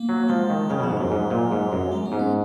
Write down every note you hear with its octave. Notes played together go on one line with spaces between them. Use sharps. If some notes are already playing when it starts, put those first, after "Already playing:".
Already playing: A#3
F#3
F3 G#3
D#3
C#3 F#3
B2
F3
G#2
F#2 F#3
G#2
A#2
G#2
F#2
G#3
B3
G#2
C#4